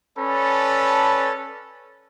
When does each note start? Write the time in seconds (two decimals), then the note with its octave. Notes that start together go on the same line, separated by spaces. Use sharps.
0.18 C#4 A4 B4 D5 A5 B5